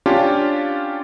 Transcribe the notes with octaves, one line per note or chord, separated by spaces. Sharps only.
C#4 D4 F4 G4 A5